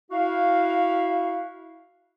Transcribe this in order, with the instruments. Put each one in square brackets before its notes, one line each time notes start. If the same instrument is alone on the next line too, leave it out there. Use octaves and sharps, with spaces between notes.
[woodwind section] E4 F#4 F5